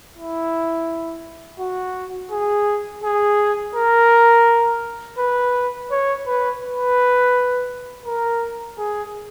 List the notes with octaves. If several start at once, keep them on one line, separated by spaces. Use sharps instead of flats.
E4
F#4
G#4
G#4
A#4
B4
C#5
B4
B4
A#4
G#4